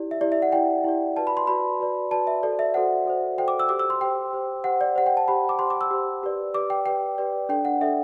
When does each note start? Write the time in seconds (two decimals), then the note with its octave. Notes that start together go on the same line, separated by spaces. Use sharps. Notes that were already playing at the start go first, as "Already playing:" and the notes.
Already playing: E4 G4 D5
0.11 E5
0.21 E4 G4 D5
0.32 E5
0.42 F#5
0.52 E4 G4 D5 G5
0.84 E4 G4 D5
1.16 F#4 B4 D5 A5
1.27 B5
1.37 C6
1.47 F#4 B4 D5 B5
1.80 F#4 B4 D5
2.11 F#4 B4 D5 A5
2.27 E5
2.43 F#4 A4 C5 D5
2.59 E5
2.74 F#4 A4 C5 F#5
3.06 F#4 A4 C5
3.38 F#4 A4 C5 G5
3.48 D6
3.60 E6
3.69 G4 C5 D6
3.79 E6
3.90 C6
4.01 G4 C5 G5
4.33 G4 C5
4.64 G4 C5 F#5
4.81 D5
4.96 G4 C5 F#5
5.06 G5
5.17 A5
5.28 G4 C5 B5
5.49 D6
5.59 G4 C5 C6
5.70 D6
5.81 E6
5.91 G4 C5
6.23 G4 B4 D5
6.54 G4 B4 D5 D6
6.70 G5
6.86 G4 B4 D5 G5
7.18 G4 B4 D5
7.49 D4 A4 D5 G5
7.65 F#5
7.81 D4 A4 D5 E5